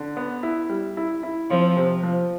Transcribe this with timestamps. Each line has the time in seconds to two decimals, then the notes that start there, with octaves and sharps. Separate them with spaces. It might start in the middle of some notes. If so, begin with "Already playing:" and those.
Already playing: D3
0.17 B3
0.43 E4
0.69 G3
0.97 E4
1.23 E4
1.50 F3 C4
1.77 C3
2.03 F3